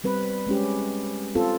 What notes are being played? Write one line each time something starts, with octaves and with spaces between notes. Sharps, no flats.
G3 C4 B4
G#3 C#4 G4
C4 F4 A4